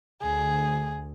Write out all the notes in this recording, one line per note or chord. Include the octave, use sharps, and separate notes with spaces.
D2 G#4